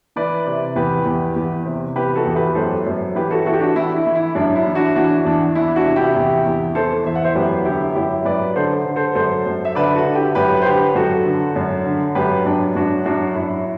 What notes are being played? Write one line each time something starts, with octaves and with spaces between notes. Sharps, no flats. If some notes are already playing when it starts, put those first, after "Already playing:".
E3 B4 D5
C3
E2 G4 B4
E2
E2
C3
E3 G4 B4
F#4 A4
E2
G4 B4
F#2 A4 C5
F#2
E3 G4 B4
F#4 A4
E3 F#4 A4
G4
D4 F#4
E3 E4
E4
E3
E4
F#2 D4
E4
E3
D4 F#4
E3 D4 F#4
E2 D4
E3 E4
D4 F#4
C3
E4 G4
E2
E2
E3 A4 C5
E2 E5
F#5
C5 E5
F#2 G4 B4
D3 E4 G4
F#2 E4 G4
F#2 B4 D5
D3 A4 C5
D3
A4 C5
F#2 A4 C5
F#2
E5
D3 B4 D5
F#4 A4
D3
E4 G4
F#2 G4 B4
C5
D3 G4 B4
F#2 F#4 A4
D3
F#2
D3
F#2 G4 B4
F#2 D4
F#2 D4 F#4
F#2 D4 F#4
F#2 E4